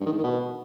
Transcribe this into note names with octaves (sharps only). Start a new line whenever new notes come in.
G2
D#3
G#2
D#3
B2